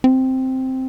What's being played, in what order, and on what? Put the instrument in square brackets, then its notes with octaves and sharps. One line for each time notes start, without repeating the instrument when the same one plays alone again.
[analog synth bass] C4